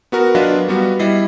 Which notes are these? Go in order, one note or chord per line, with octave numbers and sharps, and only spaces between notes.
B3 F#4 A#4
F#3 D4 F4 B4 D#5 F5
G3 B3 F#4
G3 E4 D#5 C7